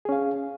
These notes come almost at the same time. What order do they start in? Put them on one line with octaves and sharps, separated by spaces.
G#4 C#4 F5